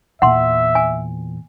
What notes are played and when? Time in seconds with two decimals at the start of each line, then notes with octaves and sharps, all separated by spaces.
0.22 E2 A#2 E5 F#5 C6
0.75 G#5